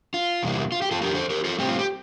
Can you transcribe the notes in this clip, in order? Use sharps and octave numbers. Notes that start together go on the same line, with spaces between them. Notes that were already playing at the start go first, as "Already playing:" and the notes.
F4
E2 C3 G3 A#3 E4
F4
G4
F4 A4
F2 D3 F3 G4 A#4
A4 C5
G4 A#4
F4 A4
A2 G3 C4 G4
F4
G4